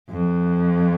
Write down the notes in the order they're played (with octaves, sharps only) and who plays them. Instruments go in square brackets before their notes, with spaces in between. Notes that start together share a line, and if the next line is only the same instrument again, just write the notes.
[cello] F2